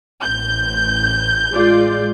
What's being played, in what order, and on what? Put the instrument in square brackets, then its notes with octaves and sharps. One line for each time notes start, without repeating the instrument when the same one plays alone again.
[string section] A1 G6
[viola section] G#3 F4 D5